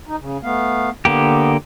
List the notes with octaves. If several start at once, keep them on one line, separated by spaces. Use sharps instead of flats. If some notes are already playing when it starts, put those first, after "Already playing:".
D#4
C#3
A3 B3 F5
D3 A#3 B3 G4